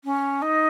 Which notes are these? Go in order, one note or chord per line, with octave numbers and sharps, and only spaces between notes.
C#4
D#4